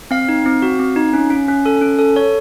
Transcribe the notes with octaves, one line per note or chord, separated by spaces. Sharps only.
C4 F5
D#4
C4
F#4
C4
D#4
C#4
C#4
C#4
A4
C#4
A4
A4 C#5